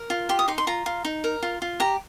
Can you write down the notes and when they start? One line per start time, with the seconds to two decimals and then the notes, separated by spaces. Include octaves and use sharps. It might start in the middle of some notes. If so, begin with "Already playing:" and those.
Already playing: A#4
0.10 F4
0.29 G4 C6
0.39 D#6
0.48 D#4 C6
0.58 C6
0.67 F4 A#5
0.86 F4
1.05 D#4
1.24 A#4
1.43 F4
1.62 F4
1.80 G4 A#5